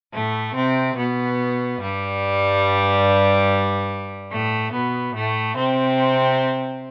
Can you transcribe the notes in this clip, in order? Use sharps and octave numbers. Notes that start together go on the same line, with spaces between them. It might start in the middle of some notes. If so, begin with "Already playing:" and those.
A2 A3
C3 C4
B2 B3
G2 G3
A2 A3
B2 B3
A2 A3
C3 C4